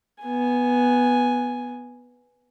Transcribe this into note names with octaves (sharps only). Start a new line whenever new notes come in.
B3 G#5